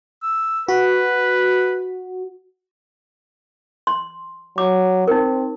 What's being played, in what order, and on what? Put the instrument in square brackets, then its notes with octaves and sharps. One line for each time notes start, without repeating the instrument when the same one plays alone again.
[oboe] E6
[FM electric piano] F#4 [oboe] B4
[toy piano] C6
[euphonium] F#3 [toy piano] D6
[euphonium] C4 [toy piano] D#4 A#4